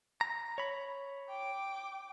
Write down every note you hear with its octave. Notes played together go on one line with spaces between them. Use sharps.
A#5
C#5 B5
G5 D6